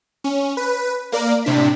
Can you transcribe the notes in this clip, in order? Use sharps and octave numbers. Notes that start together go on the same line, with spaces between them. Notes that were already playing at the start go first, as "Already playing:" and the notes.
C#4
B4
A#3 A#4 D5
A2 C3 D4 B6